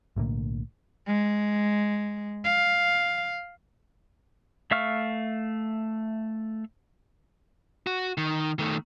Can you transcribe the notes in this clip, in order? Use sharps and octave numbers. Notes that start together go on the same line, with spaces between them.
B1 A2 D3 A#3
G#3
F5
A3 E5 F5 C#6 F6
F#4
D#3
D#3 A3